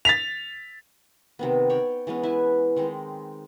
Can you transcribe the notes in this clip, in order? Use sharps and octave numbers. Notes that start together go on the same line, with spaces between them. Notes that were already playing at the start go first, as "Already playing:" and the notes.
A6 B6 F7
C3 D#3 B3
C#5 D5 G5
E3 G#3 B3 C#4
E4 B4 E5 G#5
D#3 G#3 C4 D#4